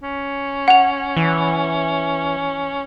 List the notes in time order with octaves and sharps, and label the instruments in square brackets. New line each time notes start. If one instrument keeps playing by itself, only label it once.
[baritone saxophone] C#4
[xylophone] F#5 F7
[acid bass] E3